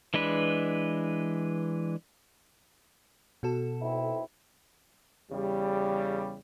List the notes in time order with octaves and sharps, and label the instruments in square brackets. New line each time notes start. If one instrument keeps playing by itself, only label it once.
[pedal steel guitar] E3 G#3 D4 B4
[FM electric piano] B2 F#4 A4
[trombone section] B1 C4 E4
E2 C#3 G3